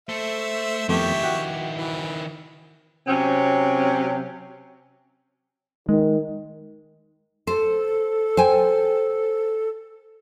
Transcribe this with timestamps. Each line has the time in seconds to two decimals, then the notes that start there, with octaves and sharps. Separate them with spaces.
0.09 A3 C5 E5
0.89 F2 D#3 A3 B3 E4 G4 E5 C#6
1.23 F#4 F#5 G5
1.76 E3
3.07 C3 F#3 C4 C#4
5.89 D#3 G#3
7.47 A4 C5
8.37 C5 G5 G#5